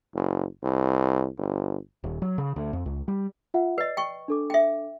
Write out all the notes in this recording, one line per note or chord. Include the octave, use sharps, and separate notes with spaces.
F#1
C2
G1
D#1
F#3
C#3
D2
F2
C#2
G3
F4 E5 F#5
B4 D5 D#5 C7
G5 C#6
D4 A4 D6
E5 G5